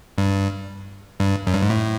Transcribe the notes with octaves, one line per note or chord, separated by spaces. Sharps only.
G2
G2
F#2
G2
G#2
A2